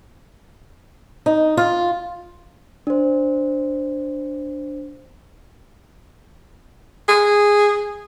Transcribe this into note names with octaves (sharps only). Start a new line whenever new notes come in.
D#4
F4
D4 C5
G#4